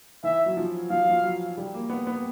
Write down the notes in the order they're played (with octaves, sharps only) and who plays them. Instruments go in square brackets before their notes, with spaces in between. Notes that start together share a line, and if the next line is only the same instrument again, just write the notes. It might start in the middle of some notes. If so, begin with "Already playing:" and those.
[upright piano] E3 [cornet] E5
[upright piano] F#3
F3
[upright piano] F3 [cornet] F5
[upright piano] F#3
F3
F#3
G3
A#3
B3
B3